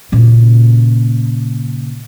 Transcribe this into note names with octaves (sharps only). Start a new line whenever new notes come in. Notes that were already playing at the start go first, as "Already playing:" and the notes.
A#2 C#3